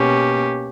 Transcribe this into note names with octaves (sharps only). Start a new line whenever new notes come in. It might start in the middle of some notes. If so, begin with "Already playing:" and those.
Already playing: B2 A#3 C#4 G4